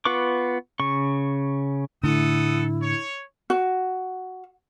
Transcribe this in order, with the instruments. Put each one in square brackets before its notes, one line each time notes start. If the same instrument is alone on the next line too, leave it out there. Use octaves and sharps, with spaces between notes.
[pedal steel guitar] B3 F4 B4 C#6 D6
C#3 C#6
[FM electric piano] A2 [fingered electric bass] D3 [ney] E4 [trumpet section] A4 F#5 D#6
[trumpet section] C#5
[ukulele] F#4